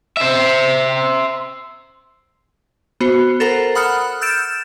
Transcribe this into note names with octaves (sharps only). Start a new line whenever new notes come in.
C5 E5
B3 F#4 C5
A4 A#4 C5 F#5 A#5
F#5 B5 D#6 F6 F#6 C#7
E6 F6 G6 A6 D7 E7